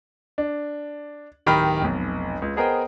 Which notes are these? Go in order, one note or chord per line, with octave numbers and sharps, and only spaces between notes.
D4
D1 D#3 G4 A#5 B5 F6
F1 B1
C#2
B3 G#4 A#4 C5 D#5 G5